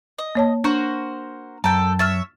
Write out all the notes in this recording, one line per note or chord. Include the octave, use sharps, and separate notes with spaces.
D#5
A#3 C#5 A5
D4 F#4 A#4 C5
F#2 A4 G5 A#5
C#5 E5 F6 A6